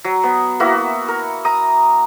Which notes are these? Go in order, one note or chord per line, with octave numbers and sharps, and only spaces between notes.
F#3
B3
A#3 B3 E4 F#4
A#4
A#5 D#6